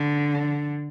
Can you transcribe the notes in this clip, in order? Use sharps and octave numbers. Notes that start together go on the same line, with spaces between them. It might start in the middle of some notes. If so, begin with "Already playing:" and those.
Already playing: D3